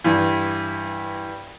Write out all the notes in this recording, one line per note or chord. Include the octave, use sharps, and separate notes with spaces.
G2 E3